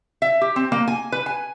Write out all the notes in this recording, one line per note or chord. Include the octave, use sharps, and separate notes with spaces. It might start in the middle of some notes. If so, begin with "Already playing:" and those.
E5
G4
C4
A#3
G#5
B4
G#5